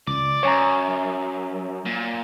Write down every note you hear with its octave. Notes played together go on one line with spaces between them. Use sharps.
C#2 D5
F#2 C#5 G#5 A#5
A#2